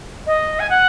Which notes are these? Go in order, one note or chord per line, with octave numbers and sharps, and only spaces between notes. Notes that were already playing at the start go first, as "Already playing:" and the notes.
D#5
G#5
F#5